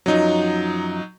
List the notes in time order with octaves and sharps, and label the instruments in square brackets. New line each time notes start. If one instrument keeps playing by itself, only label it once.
[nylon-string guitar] F#2 F3 D#5 [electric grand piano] F#3 D#4